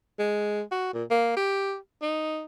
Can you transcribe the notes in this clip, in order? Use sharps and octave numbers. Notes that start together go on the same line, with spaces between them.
G#3
F#4
A#2
A#3
G4
D#4